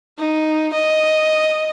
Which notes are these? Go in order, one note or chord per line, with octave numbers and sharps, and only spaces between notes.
D#4
D#5